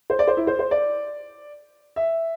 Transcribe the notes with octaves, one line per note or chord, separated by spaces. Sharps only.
C5
D5
C5
E4
C5
C5
D5
E5